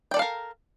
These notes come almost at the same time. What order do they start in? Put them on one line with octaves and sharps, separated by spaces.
G5 D5 A4 F5 A#4